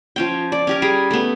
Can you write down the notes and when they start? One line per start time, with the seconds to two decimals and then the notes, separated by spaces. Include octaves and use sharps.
0.16 F3 C#4 G5
0.52 D5
0.67 C#4 G4 A#4
0.82 G3 G#4 A#4
1.11 A3 B3